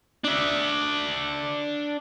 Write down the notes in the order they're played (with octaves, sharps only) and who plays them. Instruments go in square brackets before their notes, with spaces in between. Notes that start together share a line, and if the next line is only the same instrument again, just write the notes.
[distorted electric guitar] D4 E5